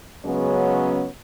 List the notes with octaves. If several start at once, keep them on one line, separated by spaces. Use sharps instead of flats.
C#3 F#3 G#3 B3 C#4